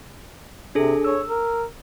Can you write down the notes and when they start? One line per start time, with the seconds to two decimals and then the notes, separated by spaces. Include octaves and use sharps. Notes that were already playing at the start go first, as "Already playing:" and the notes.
0.75 C3 D4 G#4 A4
1.04 C#5 E6
1.28 A#4